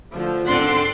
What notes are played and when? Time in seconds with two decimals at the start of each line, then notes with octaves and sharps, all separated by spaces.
0.13 D3 F3 A3
0.47 G#1 D3 C4 D5 F#5 C6